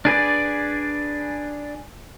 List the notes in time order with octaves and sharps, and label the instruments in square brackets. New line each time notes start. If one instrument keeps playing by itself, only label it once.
[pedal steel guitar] D4 G#4 B4 D5